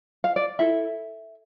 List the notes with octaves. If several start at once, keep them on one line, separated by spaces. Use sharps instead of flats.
F5
D5
E4 A4 E5